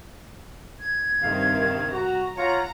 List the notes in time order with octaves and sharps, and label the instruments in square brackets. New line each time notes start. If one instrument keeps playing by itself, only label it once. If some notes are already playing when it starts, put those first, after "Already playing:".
[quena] G#6
[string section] G2 C3 D#3 [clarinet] F5
[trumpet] F#4 [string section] A#5
[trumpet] F4 [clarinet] C#5 [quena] F#5 [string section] A#5